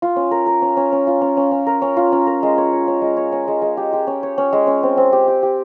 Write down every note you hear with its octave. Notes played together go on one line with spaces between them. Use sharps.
F4
C#4
A#4
A#4
C#4
C#4
C#4
F4
C#4
C#4
C#4
A#4
C#4
F4
C#4
A#4
G#3
C#5
C#5
C#4
G#3
C#5
C#4
G#3
G#3
G4
G4
C#4
C#5
C#4
G#3
C#4
C4
C4
G4
G4
G4